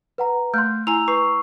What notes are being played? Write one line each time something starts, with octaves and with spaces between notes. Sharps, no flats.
B4 F#5 A#5
A3 C6 F#6 G6
E4 G#5 A#5 E6 F7
B4 C#6 C7